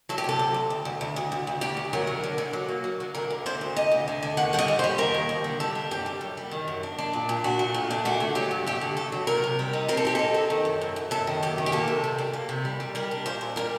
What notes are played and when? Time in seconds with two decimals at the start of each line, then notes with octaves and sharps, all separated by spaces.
0.09 F#3 A4
0.18 G4
0.24 C3 A4
0.39 D2
0.54 D2
0.70 D2
0.85 D2
1.01 D2
1.16 D2
1.32 D2
1.47 D2
1.61 D2 G4
1.77 D2
1.93 F#3 A#4
2.07 D3
2.24 D3
2.38 D3
2.53 F#3
2.69 A#3
2.84 F#3
3.00 D3
3.14 D3 A#4
3.30 D2
3.46 D3 C5
3.61 D2
3.76 D2 D#5
3.92 D2
4.08 D3
4.23 D3
4.37 D#2 F#5
4.53 G3 F#5
4.59 D#5
4.68 D#2
4.79 C5
4.84 G3
4.98 D#2 A#4
5.14 D#2
5.29 D#2
5.44 D3
5.60 G3 A4
5.75 D4
5.91 F#2 G4
6.06 G3
6.21 F#2
6.37 G3
6.51 D#3
6.68 F#2
6.83 D4
6.98 D4
7.13 A#2
7.29 A#2
7.44 D4 F#4
7.59 A3
7.74 A#2
7.90 D4
8.05 A3 F#4
8.20 D3
8.35 F#3 G4
8.51 G2
8.66 A3 G4
8.81 D3
8.97 A3 A4
9.12 F#3
9.27 C3 A#4
9.44 C3
9.59 G3
9.73 D#4
9.88 C4 A#4
9.97 A4
10.05 D#4 G4
10.15 D#4 A4
10.34 C4
10.50 D#3
10.65 F#2
10.81 F#2
10.96 F#2
11.11 F#2 A4
11.27 D#3
11.43 F#2 G4
11.58 D#3
11.66 G4
11.72 A#3 A4
11.88 C3
12.04 C3
12.18 G3
12.33 A#3
12.49 C3
12.65 G3
12.80 G3
12.95 G3 A#4
13.11 D4
13.26 A#2 C5
13.41 A#2
13.56 G3 A#4